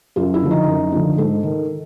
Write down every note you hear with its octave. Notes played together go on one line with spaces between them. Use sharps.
F#2 F4
E4
D3 F3
D#4
F#2
D3 F3
G#2 A4
D#3